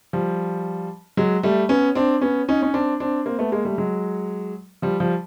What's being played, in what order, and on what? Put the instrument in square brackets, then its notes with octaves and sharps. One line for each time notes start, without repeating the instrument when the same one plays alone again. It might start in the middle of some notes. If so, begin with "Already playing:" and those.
[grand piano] F3 G3
F#3 G#3
G3 A3
B3 C#4
C4 D4
B3 C#4
C#4 D#4
C#4
C4 D4
C4 D4
A#3 C4
A3 B3
G#3 A#3
G3 A3
F#3 G#3
F3 G3
F3 G3